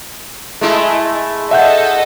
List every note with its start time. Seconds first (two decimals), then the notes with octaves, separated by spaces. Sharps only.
0.61 G#3 A3 E4
1.51 A4 D#5 E5 F#5 G6